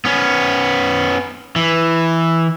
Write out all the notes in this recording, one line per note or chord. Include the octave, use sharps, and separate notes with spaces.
B3 C#4
E3